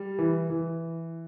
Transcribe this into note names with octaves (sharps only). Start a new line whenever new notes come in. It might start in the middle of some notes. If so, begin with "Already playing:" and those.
Already playing: G3
E3
E3